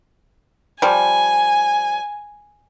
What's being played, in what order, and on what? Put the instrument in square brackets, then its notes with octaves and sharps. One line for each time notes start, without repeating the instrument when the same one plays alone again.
[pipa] F3 G3 [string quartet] G#5